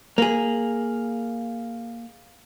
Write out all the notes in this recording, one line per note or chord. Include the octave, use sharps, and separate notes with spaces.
A#3 G#4